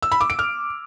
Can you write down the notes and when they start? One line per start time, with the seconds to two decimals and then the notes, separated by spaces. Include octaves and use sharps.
0.03 E6
0.12 B5
0.21 D6
0.30 D7
0.39 F6